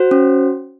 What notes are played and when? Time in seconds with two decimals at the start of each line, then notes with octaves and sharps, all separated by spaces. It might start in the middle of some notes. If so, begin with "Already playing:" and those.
Already playing: F#4 C5
0.11 C#4